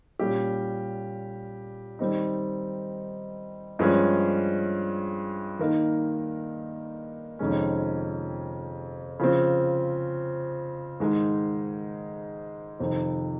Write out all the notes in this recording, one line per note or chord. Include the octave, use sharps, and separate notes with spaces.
A#2 G3 C#4 G4
D#3 G3 C4 D#4
G2 F3 G#3 C#4 G#4
D#3 A#3 D#4 A#4
F2 C3 D#3 G#3 C#4
C#3 F3 C4
G#2 D#3 G#3 D#4
F2 C3 D#3